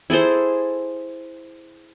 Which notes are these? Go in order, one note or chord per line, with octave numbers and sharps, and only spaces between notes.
E4 G#4 A4 C5